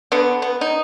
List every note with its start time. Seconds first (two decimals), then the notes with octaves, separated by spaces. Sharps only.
0.12 D3 B3
0.42 B3
0.61 D#4